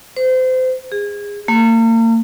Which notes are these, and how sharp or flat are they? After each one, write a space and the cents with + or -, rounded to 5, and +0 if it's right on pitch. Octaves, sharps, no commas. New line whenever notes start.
C5 -30
G#4 -25
A#3 -40